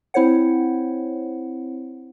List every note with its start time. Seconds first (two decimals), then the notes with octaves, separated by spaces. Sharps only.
0.14 C4 E4 C5 C#5 F#5